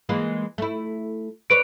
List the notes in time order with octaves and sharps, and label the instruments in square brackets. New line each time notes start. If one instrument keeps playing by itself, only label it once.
[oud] E3 G#3 A#3
A3 E4
[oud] D4 B4 C#5 [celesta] D7